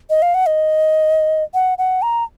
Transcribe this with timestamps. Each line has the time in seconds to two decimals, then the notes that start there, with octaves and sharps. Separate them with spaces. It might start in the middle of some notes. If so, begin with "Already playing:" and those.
0.10 D#5
0.22 F5
0.34 F#5
0.46 D#5
1.54 F#5
1.78 F#5
2.02 A#5